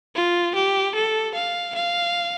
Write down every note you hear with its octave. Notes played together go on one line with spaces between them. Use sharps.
F4
G4
A4
F5
F5